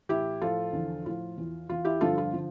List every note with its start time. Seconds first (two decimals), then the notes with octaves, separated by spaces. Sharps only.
0.09 A2 E3 E4 G4
0.41 A2 F3 F4 A4
0.73 E2 D3 F3
1.06 A2 F3 F4
1.38 E2 E3
1.69 E2 E3 F4
1.85 E4 G4
2.01 G2 D3 F3 F4 A4
2.18 F4
2.34 D3 F3